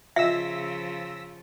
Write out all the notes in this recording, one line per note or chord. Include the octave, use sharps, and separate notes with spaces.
C#3 F3 F4 D#5 E5 E6 A#6 B6